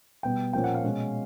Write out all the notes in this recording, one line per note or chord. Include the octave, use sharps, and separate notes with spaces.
B2 G3 B3 G5
A#2 F3 A#3 C#4 G5
F#5
F5
B2 G#3 C#4